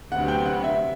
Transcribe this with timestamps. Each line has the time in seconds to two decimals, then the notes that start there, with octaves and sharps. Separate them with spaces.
0.12 D2 C3 F#3 B3 F#5
0.28 G5
0.45 F#5
0.64 E5